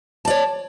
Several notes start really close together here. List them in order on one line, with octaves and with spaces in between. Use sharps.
A5 D5 C#5